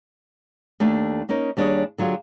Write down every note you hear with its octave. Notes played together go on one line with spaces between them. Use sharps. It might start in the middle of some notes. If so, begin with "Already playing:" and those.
D#2 A3 D4
A#3 C#4 D#4 A#4
D#2 G3 D4 G#4 C#5 D#5
D3 F#3 F4 G4 G#4